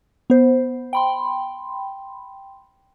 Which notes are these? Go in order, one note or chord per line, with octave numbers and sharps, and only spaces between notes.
B3 C5
G5 B5 C6